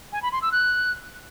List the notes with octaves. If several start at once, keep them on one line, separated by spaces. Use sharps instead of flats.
G#5
B5
C6
E6
F#6